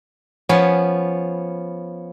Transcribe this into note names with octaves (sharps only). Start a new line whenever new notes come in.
F3 B3 C#4 G#5 B5